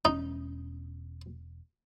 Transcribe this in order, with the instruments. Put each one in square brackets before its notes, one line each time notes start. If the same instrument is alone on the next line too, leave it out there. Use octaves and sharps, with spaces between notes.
[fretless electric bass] E1 C#4 [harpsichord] D#4